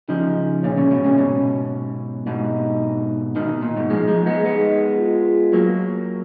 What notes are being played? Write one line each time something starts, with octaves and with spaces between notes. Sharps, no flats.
C#3 F3 D#4
A#2 C#3 C#4
A#2 C#3
G#2 B2
A#2 C#3
G#2 B2
G#2 B2 D#4
B2 D#3 D#4
A#2
G#2 B2
F3 G#3 D#4
F3 G#3
G#3 B3
G#3 B3
F4
F#3 A#3